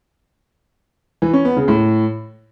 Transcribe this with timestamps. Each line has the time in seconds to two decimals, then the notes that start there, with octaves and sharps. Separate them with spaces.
1.22 E3
1.33 C#4
1.45 B3
1.56 C#3
1.68 A2